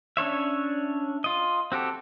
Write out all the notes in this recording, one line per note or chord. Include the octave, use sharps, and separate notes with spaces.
C#4 D4 C#5 E5
F4 D#5
C4 F#4 G4 A4